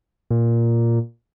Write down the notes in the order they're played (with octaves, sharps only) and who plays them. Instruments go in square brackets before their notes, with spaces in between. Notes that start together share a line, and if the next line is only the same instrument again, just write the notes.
[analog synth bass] A#2